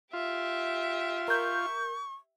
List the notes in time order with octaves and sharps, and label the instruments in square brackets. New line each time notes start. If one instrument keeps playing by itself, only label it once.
[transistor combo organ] F4 [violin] G4 E5
[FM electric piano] A#4 G6 [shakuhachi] C#6